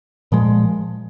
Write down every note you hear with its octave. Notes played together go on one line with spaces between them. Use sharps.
A#2 F3 G#3